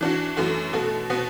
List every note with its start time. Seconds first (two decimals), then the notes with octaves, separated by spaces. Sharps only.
0.01 E3 D4 F#4
0.37 F#2 E3 A3 F#4
0.73 B2 A3 F#4
1.10 B2 B3 F#4